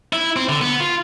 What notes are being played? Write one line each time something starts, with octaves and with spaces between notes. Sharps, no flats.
E4
C4
D3
B3
F4